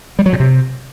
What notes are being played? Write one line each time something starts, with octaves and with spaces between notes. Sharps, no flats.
G3
F#3
A#2
C3